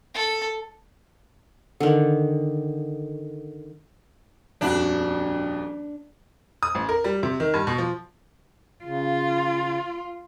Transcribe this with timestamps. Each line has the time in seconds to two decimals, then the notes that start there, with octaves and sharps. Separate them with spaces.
0.14 A4
1.80 D3 D#3
4.61 D#1 F2 D4 F#4
6.63 D#6
6.75 A1
6.89 A#4
7.04 G3
7.23 C3
7.40 D#3
7.54 G2
7.67 B2
7.78 F3
8.84 C#3 F4